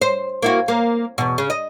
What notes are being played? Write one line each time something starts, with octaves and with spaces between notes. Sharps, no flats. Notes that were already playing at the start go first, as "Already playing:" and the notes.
C5
A#3 E4 F#4
A#3
E2 B2
C#3
D#5